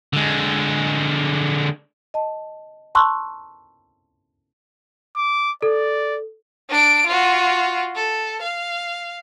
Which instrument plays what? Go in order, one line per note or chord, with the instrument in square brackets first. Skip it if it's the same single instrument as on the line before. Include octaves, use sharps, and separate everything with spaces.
[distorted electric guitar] D3 G#3
[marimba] D#5 A5
A5 A#5 C6 C#6 E6 F#6
[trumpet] D6
[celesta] A4 [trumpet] D5
[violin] D4 D7
F4 F#4
A4
F5